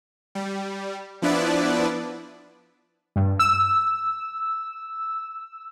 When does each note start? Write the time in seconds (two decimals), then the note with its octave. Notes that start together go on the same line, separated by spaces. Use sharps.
0.35 G3
1.22 F3 B3 D4 E4 B4 D5
3.16 G2
3.39 E6